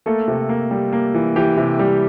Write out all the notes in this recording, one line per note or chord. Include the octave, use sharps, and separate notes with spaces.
A3 A#3 A4
C3
A#3
G3
A#3
E3
E3 G4
C3
G3